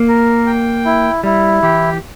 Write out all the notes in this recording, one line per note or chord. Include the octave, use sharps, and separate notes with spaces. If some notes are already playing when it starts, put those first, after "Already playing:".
Already playing: A#3
A#4
G5
E4
G3 E4
E3 G4